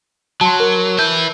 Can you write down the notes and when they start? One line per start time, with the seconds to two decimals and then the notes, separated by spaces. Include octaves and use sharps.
0.41 F#3 A5 C6
0.60 A#4
0.73 G7
0.99 B4 E5 A5 G6